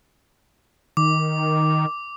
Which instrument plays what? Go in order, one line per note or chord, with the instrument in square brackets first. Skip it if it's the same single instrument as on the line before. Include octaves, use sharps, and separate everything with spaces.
[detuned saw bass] D#3 [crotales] D6